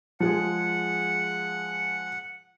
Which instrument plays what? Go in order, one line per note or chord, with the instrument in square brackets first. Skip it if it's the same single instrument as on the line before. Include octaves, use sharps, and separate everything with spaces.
[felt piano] F3 G#3 G#4 [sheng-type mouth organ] F#5